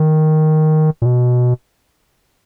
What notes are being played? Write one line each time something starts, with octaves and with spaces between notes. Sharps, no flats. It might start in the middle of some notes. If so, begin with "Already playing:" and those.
Already playing: D#3
A#2
B2